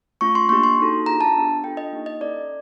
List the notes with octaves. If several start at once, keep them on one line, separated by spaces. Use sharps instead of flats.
A3 C#4 F4 C#6
C6
A#3 D4 G4 C#6
C6
A#3 D#4 F#4 A4
D4 F4 G#4 A#5
A5
B3 D4 G4
D4 F4 A4 G5
D#5
A#3 D#4 G4
D#5
C#4 E4 A4 D5